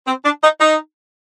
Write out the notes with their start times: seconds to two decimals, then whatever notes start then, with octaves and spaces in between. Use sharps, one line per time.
0.06 C4
0.24 D4
0.43 D#4
0.59 D#4